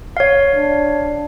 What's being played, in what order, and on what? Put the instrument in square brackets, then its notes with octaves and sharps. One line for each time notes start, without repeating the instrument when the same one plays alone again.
[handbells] C#5 F5
[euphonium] D4